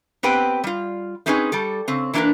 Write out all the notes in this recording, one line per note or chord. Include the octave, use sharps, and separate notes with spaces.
B3 C4 G4 B4 G5
G3 F4
A3 C4 C#4 D#4 G#4 B4
G3 A4
C#3 C4
E3 A#3 D4 G4 A#4 B4